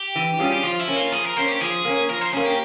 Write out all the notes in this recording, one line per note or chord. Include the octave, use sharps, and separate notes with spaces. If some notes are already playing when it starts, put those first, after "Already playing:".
Already playing: G4
E3
G3 C#4 F4 G#4
G4
F3 F4
E4
A#3 C#4
F4
F3 G#4
A#4
A#3 C#4 C5
G4
F3 G#4
A#3 C#4
F3 A#4
C5
A#3 C#4 G#4
G4